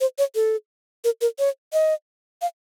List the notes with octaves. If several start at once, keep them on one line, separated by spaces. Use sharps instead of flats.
C5
C#5
A4
A#4
A#4
C#5
D#5
F5